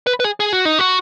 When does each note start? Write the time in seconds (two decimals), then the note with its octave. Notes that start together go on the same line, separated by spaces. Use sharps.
0.07 B4
0.20 B4
0.24 G#4
0.40 G#4
0.53 F#4
0.65 D#4
0.79 F#4